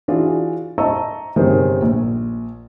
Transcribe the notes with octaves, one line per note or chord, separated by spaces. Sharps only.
E3 D4 F4 F#4 G#4
D#5 E5 A5 A#5 C#6 E6
G1 C3 D#3 C4 G#4
A#1